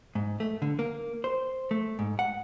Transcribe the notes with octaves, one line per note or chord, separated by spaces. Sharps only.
G#2
A3
D3
A#3
C5
A3
G#2
F#5